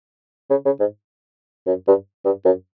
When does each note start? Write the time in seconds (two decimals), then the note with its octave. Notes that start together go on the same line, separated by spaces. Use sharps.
0.50 C#3
0.66 C#3
0.80 G#2
1.67 F#2
1.87 G2
2.25 G2
2.45 F#2